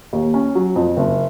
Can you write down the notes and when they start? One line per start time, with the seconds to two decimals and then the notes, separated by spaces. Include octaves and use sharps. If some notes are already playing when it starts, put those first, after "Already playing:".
0.13 D#2
0.34 C#4
0.55 F#3
0.76 F2
0.97 F#1